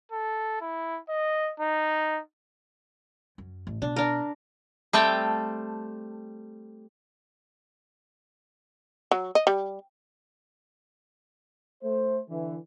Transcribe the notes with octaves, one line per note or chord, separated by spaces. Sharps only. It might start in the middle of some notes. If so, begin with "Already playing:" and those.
A4
E4
D#5
D#4
F#2
A1
B2 D4
D4 A#4
G3 A3 C4 G5 A5
F#3
D#5
G3
A3 C5
D3 E3